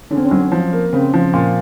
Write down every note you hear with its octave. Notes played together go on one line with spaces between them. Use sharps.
D3 C#4
C4
C#4
F#3
F3
A#3
C#3 C4
F3
A#2